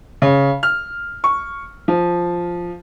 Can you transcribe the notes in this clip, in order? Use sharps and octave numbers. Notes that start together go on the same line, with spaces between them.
C#3
F6
C#6
F3